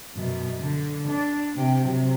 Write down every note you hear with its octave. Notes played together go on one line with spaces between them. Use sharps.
F#2 B2
D3
D4
C3 G5
C3 F#3